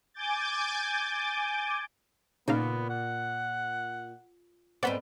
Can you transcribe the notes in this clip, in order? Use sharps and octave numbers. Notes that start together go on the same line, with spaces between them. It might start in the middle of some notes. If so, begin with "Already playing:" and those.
G#5 D6 G6 A6
A#2 C#3 B3 D#4 F5
F#5
G#2 B3 C4 D5 F#5 B5